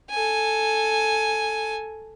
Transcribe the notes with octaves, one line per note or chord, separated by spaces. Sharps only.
A4 G#5